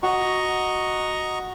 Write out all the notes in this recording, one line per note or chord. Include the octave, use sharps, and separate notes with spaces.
F#4 D#5 A#5 C#6